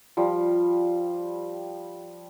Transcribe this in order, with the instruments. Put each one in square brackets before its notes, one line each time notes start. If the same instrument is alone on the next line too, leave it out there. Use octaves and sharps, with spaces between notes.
[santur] F3 G3